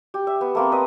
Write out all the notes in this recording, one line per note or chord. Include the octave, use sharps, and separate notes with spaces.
G4
E5
B3
A3 A#3 C4
B4 D#5